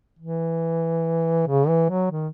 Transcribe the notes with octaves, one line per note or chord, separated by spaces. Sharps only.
E3
C#3
E3
F#3
D#3